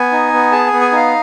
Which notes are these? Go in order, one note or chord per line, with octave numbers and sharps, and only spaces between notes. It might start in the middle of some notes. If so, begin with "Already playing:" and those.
Already playing: B3 G#5
D#4
B3
G#4 A5
G#5
B3
G#5
D#4 F5